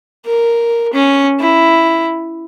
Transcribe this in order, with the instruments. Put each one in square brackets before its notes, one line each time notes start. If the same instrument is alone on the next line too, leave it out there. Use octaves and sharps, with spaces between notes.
[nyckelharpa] A#4
C#4
E4